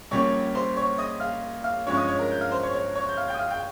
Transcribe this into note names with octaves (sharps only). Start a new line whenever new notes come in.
A#1 A#2 G3 C#4 C#5 C#6
C5 C6
C#5 C#6
D#5 D#6
F5 F6
F5 F6
G2 F3 G#3 C#4 F4 C#5 C#6
D#5 D#6
C#5 C#6
A#4 A#5
G6
F5 F6
C5 C6
C#5 C#6
C#5 C#6
C#5 C#6
G6
F5 F6
G5 G6
D#6
F5 F6
G5 G6